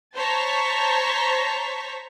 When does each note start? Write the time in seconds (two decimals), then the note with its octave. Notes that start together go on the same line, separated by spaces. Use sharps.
0.15 C5 C#5 A5 A#5 C#6 B6